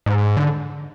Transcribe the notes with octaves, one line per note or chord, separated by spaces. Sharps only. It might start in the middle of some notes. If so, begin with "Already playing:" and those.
G#2
D3